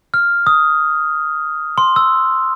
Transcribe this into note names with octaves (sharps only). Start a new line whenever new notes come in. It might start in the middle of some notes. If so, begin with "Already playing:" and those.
F6
D#6
C6
E6